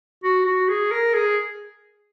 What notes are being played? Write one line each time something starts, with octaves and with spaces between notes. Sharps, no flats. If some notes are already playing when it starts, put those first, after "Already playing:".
F#4
F#4
G#4
A#4
G#4